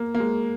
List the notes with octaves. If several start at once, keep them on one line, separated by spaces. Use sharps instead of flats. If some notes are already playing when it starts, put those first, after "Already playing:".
Already playing: A#3
A#3
G#3